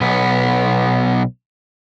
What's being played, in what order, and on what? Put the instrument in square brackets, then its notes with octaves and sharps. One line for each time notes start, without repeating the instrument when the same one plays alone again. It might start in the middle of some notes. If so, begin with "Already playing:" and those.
[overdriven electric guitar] B1 B3